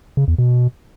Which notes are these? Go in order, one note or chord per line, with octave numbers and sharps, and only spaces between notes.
C#3
E2
B2